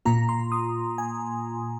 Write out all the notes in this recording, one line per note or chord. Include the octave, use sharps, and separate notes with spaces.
A#2 A#3 F4 A#5
C6
D#6
G#5